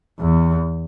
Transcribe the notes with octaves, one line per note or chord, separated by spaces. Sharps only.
E2